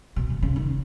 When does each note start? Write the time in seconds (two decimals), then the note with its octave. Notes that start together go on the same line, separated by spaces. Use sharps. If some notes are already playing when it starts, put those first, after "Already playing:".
0.16 B2
0.30 A#2
0.43 C#3
0.56 D#3